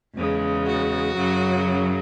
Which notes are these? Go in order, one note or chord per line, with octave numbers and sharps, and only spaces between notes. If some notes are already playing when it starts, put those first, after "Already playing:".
E2 C#3 G#3
F#4
F#2 C#3 F#3